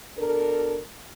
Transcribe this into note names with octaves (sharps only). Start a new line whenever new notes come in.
B2 D4 A4 A#4